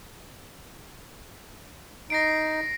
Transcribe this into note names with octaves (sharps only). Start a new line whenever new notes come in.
D#4 A#6 C7 D7